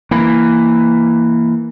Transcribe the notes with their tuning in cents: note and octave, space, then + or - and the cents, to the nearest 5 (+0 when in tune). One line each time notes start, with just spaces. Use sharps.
E3 +5 A#3 -5